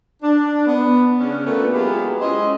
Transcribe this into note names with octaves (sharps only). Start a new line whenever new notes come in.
D4
B3
C#3 C#4 D4
A#2 A3 B3
F#3 G#3 B3 E4 F4 G4
G#3 C#4 E4 C5 D#5